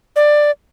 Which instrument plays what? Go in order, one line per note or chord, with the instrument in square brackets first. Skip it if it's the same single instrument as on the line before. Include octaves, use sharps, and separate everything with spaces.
[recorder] D5